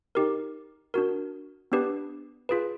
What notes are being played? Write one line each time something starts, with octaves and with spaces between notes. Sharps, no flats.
D#4 G4 A#4
D4 F#4 A#4
B3 D4 G4 B4
F4 G#4 B4